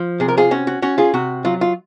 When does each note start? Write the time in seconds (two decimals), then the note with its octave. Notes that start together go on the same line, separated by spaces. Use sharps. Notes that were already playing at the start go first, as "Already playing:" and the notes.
Already playing: F3
0.20 C3 G#4
0.28 A#4
0.38 F4 G#4
0.51 C#4 F#4
0.67 F#4
0.82 C#4 F#4
0.98 F4 G#4
1.14 C3 F#4
1.45 F#3 F4
1.61 F4